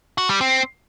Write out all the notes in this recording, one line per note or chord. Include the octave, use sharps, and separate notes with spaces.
F#4
G3
C4